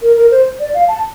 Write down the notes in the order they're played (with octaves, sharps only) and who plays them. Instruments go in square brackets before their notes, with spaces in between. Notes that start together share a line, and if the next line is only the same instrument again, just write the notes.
[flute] A#4
A#4
C5
D5
F5
A5